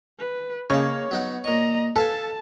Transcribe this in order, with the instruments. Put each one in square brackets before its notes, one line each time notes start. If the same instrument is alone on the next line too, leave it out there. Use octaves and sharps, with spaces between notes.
[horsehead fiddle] B4
[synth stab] C#3 [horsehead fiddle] A#3 [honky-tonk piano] C#5 [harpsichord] D#5 A5
[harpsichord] F#3 D#4 F#5 [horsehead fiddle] B3
[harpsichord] A#2 C#6 [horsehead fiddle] D#5 A#5
[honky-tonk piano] A4 [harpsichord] B4 F5 G#5 [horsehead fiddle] A5